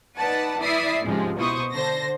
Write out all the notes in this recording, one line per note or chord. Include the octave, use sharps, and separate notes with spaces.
D#4 B4 D5 F#5 A5
E3 E4 D5 E5 D#6 C7
C#2 G#2 C3 F3 G#3
B2 E4 C5 C#6 D#6
D3 C5 A5 A#6